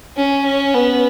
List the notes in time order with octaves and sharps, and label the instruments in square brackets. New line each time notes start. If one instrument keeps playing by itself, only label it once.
[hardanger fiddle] C#4
C#4
B3